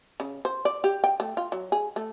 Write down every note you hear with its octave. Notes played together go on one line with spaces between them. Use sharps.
C#3
C5
D5
G4
G5
A3
F4
F#3
G#4
A3